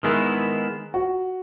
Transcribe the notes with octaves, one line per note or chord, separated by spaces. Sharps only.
D#3 G#3 B3 E4 A#4
F#4